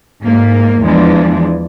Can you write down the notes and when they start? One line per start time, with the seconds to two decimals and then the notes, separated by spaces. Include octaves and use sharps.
0.21 G#2 A#3
0.82 E2 E3 F3 G#3 D4